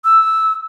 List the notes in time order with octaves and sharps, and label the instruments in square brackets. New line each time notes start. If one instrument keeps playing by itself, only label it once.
[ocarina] E6